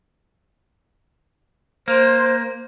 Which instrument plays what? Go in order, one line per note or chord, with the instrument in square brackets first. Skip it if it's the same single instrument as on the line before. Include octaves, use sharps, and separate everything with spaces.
[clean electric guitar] A#3 [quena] C5